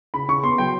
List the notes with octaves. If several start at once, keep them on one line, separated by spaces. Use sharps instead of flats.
C#3 B5
C#3 C#6
B3 C6
F#3 G5